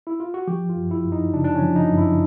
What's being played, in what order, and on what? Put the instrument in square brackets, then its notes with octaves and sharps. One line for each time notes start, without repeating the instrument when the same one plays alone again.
[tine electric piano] E4
F4
F#4
[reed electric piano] F3 [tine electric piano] G4
[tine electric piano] F4
[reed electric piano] F#2
[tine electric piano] E4
[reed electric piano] F#2
[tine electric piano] D#4
[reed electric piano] C#3 [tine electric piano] D4
[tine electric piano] D4
C#4
[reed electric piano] F3
[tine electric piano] D#4
[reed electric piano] F#2
[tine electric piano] E4